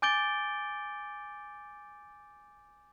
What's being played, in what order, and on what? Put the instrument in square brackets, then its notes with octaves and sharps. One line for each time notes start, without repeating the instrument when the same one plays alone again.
[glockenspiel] G#5 D6 G6 A6 D7 G7